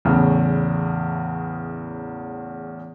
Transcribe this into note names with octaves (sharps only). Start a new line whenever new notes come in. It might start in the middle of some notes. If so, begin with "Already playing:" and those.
E2 A2 C#3